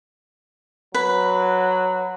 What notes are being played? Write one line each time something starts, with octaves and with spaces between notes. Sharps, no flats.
F#3 B4